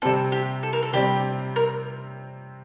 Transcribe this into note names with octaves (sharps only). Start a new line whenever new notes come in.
C3 G3 C4 A4
G4
A4
A#4
A4
C3 G3 C4 G4
A#4